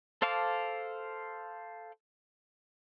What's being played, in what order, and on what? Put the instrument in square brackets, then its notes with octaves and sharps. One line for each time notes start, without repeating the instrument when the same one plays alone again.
[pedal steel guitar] A4 C5 F5 A5 D6